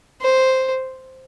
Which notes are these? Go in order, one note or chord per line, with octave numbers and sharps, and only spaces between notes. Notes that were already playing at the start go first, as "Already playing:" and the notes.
C5